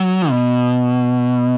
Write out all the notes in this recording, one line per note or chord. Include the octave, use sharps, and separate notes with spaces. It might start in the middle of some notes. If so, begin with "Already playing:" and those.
Already playing: F#3
B2